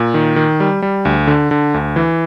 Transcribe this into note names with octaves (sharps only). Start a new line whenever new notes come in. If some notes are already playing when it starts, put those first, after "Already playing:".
Already playing: A#2
D#3
D#3
G3
G3
D2
D3
D3
D2
E3